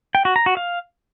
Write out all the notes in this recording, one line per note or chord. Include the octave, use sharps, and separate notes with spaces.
G5
F#4
A#5
F#4
F5